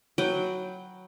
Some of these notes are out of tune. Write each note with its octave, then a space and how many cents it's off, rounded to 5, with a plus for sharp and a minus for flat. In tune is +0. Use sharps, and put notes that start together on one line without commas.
F#3 +0 B4 -5 G5 +0